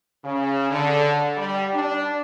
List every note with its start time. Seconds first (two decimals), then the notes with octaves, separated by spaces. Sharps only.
0.24 C#3
0.71 D3
1.37 G3
1.74 D4